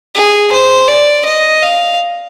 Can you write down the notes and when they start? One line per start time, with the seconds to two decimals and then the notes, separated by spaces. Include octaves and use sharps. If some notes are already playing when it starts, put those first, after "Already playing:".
0.15 G#4
0.52 C5
0.88 D5
1.25 D#5
1.62 F5